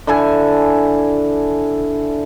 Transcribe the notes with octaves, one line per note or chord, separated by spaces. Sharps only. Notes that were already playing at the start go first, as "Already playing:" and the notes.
D3 E4 A4 G#5